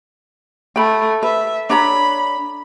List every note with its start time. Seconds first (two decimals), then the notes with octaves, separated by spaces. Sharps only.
0.76 A3 G5 B5
1.23 B4 E5
1.70 D4 C#5 A#5 B5